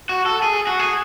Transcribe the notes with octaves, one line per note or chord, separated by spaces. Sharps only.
F#4
A4
G#4
F#4
G#4